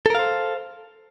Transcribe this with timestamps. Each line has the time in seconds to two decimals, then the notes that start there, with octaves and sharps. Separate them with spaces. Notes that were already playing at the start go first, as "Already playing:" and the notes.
0.06 A4
0.10 A#4
0.15 F5
0.19 C5